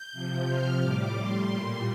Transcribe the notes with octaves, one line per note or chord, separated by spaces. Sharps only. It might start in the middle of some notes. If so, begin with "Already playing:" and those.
Already playing: G6
C3 F3
F6
A2 G3 D6
C6
A#2 G3